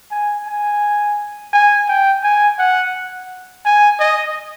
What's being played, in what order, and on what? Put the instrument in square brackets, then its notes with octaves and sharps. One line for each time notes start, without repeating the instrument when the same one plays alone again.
[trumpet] G#5
G#5
G#5
G5
G#5
F#5
G#5
D#5